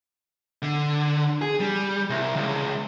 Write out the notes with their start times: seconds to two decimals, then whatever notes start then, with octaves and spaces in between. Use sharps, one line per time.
0.62 D3
1.41 G#4
1.60 G3
2.10 C2
2.36 C#2